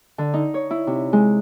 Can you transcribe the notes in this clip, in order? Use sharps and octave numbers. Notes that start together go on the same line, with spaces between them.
D3
D#4
C#5
E4
C3
G#3